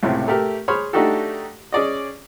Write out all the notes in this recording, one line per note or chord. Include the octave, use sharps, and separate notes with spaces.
C#2 A2 C3
A3 G4 A#4 E5
G#4 C5 C#5 B5 F6
A3 D4 D#4 F#4 G4 A4
C#4 G#4 D5 D#5